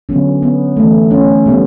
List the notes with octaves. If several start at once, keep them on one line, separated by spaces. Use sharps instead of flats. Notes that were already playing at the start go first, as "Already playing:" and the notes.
D3 F#3 B3 C#4
B3
E3 A3
C#4
B2 G3 B3